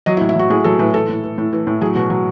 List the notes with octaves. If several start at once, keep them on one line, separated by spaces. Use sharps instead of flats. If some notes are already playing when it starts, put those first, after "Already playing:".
F#3 D#5
E4
A2
E4
F#3 F#4
A2 G#4
F#3 A4
A2 B4
E3 A4
A2
E3
A2
E3
A2
F#3 G#4
B2 F#4
F#3